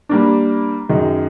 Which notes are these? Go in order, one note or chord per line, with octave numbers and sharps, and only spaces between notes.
G3 A#3 D4
F#2 D#3 G#3